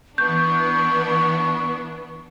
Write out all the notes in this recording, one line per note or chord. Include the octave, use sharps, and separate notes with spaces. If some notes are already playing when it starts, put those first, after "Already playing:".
E3 B3 D4 C#6 G6